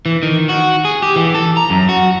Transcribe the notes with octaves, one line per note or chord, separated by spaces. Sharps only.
E3
D#3
F#4
G#4
G4
E3
A4
A#5
F#2
F#4